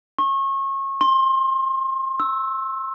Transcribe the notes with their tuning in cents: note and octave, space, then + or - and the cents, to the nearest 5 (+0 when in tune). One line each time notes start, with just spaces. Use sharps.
C#6 -30
C6 +25
E6 -5